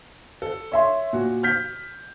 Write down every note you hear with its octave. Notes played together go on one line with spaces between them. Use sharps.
A4
C#5 E5 C6
A#2 F#4
F6 G6 B6